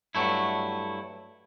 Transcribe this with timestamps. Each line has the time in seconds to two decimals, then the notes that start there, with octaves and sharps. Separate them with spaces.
0.15 G2 F#3 A3 E4